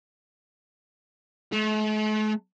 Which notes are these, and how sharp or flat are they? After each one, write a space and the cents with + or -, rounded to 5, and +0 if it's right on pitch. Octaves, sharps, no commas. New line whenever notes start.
A3 -45